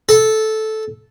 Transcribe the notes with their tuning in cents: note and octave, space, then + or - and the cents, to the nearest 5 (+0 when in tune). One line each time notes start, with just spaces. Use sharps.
A4 -10